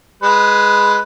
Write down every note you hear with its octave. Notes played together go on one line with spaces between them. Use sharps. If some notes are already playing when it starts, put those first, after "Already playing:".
G#3 B4